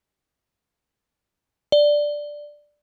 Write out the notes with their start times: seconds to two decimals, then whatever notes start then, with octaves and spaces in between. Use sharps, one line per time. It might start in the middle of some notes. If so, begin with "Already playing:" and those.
1.72 D5